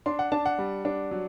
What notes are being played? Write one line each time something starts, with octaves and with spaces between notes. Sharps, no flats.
D4 C6
F#5
D4 A5
F#5
G3
D4
F#3